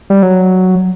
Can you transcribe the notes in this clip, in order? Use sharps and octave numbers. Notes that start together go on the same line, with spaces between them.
G3
F#3